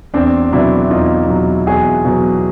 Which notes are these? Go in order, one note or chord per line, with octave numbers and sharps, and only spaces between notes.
E2 C4 D4
B2 F#3 D4 E4
E2 D#4 F4
B2 F#3
E2 F#4 G#4
B2 F#3